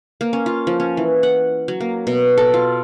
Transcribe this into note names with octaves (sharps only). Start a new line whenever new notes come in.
A#3
C#4
F4
F3
C#4
E3
F#5
F#3
A#3
B2
A4
F4